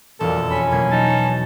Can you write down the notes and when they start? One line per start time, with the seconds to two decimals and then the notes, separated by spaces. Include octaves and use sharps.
0.20 E1 F2 A#2 A4 F5
0.50 C#4 B5 B6
0.72 B2 F#3 A#3 G#6
0.92 D#4 A5